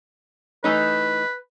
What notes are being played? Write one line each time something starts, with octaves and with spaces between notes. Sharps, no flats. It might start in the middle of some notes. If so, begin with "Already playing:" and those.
E3 A3 D#4 B4